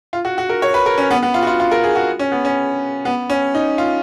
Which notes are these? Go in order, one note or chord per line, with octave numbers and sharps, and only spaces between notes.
F4
F#4
F#4
A#4
C#5
B4
A#4
C#4
B3
B3
F4
F#4
F4
F4
A#4
G#4
F#4
C#4
B3
C#4
B3
C#4
D#4
F4